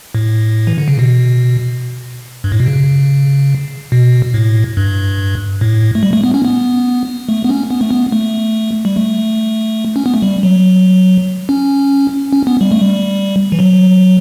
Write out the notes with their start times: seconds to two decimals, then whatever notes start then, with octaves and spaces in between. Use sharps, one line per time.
0.15 A2
0.67 E3
0.78 D3
0.88 C#3
0.99 B2
2.44 G2
2.52 A2
2.60 B2
2.66 C#3
3.92 B2
4.34 A2
4.77 G2
5.61 A2
5.95 A3
6.03 G3
6.13 A3
6.24 B3
6.34 C#4
6.45 B3
7.29 A3
7.44 B3
7.49 C#4
7.70 B3
7.81 A3
7.91 B3
8.12 A3
8.85 G3
8.96 A3
9.96 C#4
10.06 B3
10.14 A3
10.22 G3
10.43 F#3
11.49 C#4
12.33 C#4
12.47 B3
12.61 G3
12.72 A3
12.82 G3
13.52 E3
13.59 F#3